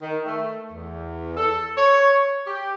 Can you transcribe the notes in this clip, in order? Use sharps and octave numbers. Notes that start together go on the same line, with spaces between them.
D#3
A3
E2
A4
C#5
G4